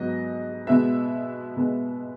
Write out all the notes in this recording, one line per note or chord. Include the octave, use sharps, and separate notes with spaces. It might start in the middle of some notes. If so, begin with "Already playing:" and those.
Already playing: G#2 F#3 B3 D#5
B2 G#3 B3 E5
B2 G#3 B3